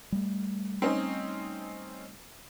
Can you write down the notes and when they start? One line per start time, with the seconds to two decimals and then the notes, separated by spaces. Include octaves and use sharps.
0.12 G3 A3
0.82 C4 C#4 D#4